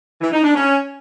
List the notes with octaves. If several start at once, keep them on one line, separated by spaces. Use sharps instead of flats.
E3
D#4
D4
C#4